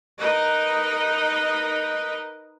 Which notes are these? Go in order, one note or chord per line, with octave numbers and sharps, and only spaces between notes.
D#4 A#4 B4 D#5